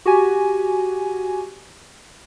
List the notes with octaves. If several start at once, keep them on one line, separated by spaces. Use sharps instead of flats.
F#4 G4 G#5